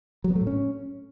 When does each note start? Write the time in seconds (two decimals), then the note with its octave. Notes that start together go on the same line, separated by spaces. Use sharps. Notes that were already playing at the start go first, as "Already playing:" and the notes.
0.24 F#3
0.30 B3
0.36 A3
0.41 A2
0.47 C#4